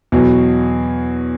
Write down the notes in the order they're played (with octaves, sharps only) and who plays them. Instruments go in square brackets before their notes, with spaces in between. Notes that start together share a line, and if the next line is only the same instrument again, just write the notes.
[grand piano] E2 B2 F#3